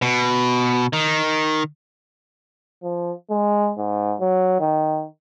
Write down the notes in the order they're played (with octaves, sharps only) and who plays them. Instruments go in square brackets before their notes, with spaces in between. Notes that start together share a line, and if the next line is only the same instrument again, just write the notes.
[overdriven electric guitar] B2
D#3
[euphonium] F3
G#3
G#2
F#3
D#3